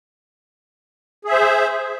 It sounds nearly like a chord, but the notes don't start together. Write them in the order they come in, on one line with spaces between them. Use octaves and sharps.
G#4 E5 C5